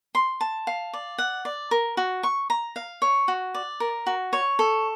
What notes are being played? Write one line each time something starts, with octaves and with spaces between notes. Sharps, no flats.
C6
A5
F5
D5
F#5
D5
A#4
F#4
C#6
A#5
F5
C#5
F#4
D5
A#4
F#4
C#5
A4